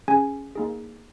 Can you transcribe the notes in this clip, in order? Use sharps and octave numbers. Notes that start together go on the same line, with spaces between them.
C#4 G#4 G#5
A#3 D#4 G#4